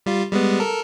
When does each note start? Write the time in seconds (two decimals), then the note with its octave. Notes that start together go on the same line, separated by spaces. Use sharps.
0.06 G3 F4
0.31 G3 G#3 B3
0.60 A4 A#4